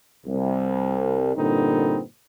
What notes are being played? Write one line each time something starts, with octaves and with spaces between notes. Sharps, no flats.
C2
G2 A#2 D3 B3 C4 D#4